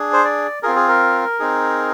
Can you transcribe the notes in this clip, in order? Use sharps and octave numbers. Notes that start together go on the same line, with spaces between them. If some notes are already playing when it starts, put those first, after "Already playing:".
Already playing: D4 G#4
C5
D5
C4 F4 G#4 A#4
G#4
A#4
C4 D#4 G#4